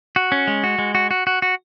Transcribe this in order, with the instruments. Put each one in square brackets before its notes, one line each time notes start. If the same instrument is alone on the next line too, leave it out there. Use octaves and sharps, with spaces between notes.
[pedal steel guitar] F#4
C#4
G#3
F#4
G#3
F#4
F#4
F#4
F#4